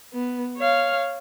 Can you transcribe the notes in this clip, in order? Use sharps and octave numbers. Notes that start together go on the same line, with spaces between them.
B3
C#5 F5